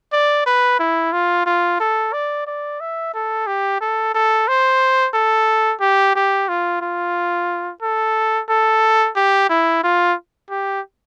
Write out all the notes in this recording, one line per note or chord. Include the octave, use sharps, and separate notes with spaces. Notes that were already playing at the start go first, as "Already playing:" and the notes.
D5
B4
E4
F4
F4
A4
D5
D5
E5
A4
G4
A4
A4
C5
A4
G4
G4
F4
F4
A4
A4
G4
E4
F4
G4